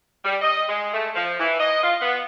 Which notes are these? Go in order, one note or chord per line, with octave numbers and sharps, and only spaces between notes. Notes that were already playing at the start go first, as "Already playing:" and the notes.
G3
D#5
G#3
A3
F3
E3
D#5
F4
B3